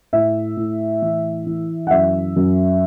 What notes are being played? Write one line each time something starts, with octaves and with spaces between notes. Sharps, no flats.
A2 E5
A2
E3
E3
F#5
F#2 E5
F#2